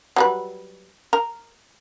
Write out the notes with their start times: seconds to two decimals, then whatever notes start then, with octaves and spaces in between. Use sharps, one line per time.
0.16 F#3 G3 B4
1.13 A#4